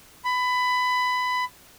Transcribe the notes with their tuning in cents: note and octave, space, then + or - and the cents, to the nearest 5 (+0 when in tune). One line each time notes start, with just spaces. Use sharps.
B5 +20